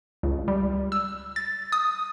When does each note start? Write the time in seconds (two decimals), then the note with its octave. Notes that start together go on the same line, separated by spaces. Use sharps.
0.23 C#2
0.48 G3
0.92 E6
1.36 A6
1.72 D#6